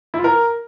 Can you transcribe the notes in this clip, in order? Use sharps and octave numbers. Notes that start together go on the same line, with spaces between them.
E4
F4
A#4